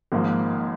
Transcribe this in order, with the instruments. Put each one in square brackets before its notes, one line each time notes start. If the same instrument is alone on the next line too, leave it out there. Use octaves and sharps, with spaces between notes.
[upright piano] G#1 G#2 F3 [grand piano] A#3